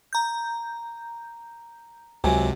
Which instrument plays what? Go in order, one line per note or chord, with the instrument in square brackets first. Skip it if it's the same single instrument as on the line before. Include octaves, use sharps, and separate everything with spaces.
[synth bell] A#5 G6
[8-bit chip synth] C#2 [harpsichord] C3 F#3 [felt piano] G#5